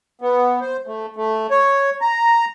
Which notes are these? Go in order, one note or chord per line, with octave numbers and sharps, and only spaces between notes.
B3
C5
A3
A3
C#5
A#5